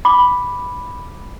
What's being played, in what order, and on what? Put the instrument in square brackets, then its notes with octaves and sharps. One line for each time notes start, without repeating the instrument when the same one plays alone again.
[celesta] B5 D6